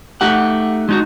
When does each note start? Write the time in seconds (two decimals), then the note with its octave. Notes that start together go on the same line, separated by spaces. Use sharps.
0.21 A3 D#4 G4 F#5
0.89 G#3 D#4 F#4